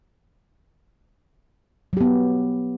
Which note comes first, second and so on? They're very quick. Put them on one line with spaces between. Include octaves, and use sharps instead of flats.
F#3 G4 B3